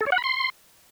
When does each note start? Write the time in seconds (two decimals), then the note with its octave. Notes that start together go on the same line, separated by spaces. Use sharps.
0.01 A4
0.06 C#5
0.12 F#5
0.18 B5
0.24 C6